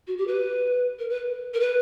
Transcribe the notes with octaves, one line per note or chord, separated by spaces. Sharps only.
F#4
G4
B4
A#4
B4
A#4
B4